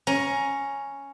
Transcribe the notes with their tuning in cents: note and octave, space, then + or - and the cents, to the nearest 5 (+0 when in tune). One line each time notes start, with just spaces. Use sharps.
C#4 +0 A#5 +15